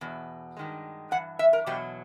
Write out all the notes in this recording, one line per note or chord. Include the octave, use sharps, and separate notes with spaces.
E2 B2
G2 D#3 G#3
G2 E3 F#5
E5
A#4
E2 B2 F#3 G4